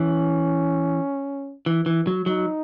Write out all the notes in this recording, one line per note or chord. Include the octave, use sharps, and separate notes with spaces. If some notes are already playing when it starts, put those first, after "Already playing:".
Already playing: E3 C#4
E3
E3
F#3
F#3 D#4